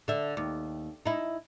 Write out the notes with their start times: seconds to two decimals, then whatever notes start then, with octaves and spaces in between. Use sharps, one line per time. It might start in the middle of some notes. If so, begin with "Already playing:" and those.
0.08 D3 E5
0.37 D#2
1.06 D#4 E4